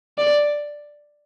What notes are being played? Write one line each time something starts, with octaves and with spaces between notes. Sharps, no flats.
D5